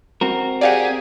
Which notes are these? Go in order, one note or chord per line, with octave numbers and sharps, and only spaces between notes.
C4 F#4 A#4
G4 G#4 D5 F5 F#5